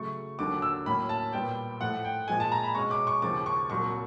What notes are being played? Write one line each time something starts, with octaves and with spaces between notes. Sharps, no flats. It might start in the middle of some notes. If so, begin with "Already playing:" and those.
Already playing: C#3 F#3 A3 C#6
D#2 D3 F#3 D6
E6
A2 F#3 A#3 C#4 B5
A5
A#2 G3 B3 G5
A2 F3 A3 F#5
G5
A#2 F3 G#3 G#5
A5
A#5
B5
B2 G#3 C#4 C#6
D6
C#6
D#2 C#3 F3 D6
C#6
C2 A#2 F#3 C#6